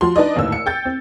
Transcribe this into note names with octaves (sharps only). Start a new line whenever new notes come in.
F3 F#4 C6
D4 D#4 B4 D5 D#5
G#1 D#2 A2 D3 E6
C#7
G5 G6 A6
C4